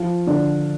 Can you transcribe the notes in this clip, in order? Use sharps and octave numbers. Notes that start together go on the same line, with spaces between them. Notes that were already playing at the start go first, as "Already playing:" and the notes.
Already playing: F3 F4
D3 D4